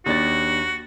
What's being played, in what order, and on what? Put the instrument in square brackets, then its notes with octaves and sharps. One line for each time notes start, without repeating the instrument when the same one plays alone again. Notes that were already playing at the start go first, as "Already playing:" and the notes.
[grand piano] D#2 D4 A6 [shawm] F#4